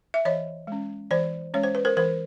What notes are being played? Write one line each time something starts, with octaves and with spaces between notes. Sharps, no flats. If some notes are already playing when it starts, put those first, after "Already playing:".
E5
E3 C#5 D#5
G#3 C#4
E3 C5 D5
G#3 C#4 C#5
C5
B4
A#4 C5
E3 A#4 C5